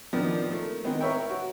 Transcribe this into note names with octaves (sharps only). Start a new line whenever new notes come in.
D#3 F3 A#3 B3 D4
A3 A#3
C3 D#3 G#3 B3 C4
A#4 B4 C#5 E5 G5
F#4